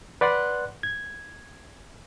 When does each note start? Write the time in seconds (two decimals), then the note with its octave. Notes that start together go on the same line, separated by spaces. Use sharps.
0.21 B4 D5 F#5 C6 F#6
0.83 G#6